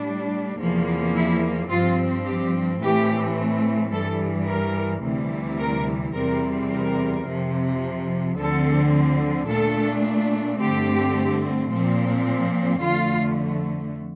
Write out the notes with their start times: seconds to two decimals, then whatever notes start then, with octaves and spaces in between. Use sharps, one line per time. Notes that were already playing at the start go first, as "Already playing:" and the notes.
Already playing: A2 G3 D4
0.58 E2 C3 F3 A#3
1.14 E4
1.69 G2 F3 C4 F4
2.25 G4
2.80 A2 E3 A3 C4 G4
3.92 G2 E3 G3 A4
4.47 A#4
5.03 D2 C3 E3 G3
5.59 A#4
6.14 E2 C3 G3 C4 A#4
6.70 A#4
7.26 F2 C3 F3
8.37 D2 D3 F3 C4 A4
9.48 A#2 A3 D4 A4
10.59 G2 D3 A3 C4 G4
11.71 A#2 F3 C4
12.82 F2 D3 A3 F4